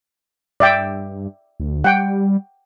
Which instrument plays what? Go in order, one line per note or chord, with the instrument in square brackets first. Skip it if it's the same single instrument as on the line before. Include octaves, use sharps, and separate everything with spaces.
[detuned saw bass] G2 [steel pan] D5 E5 G5
[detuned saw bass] D2
[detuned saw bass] G3 [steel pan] F#5 G5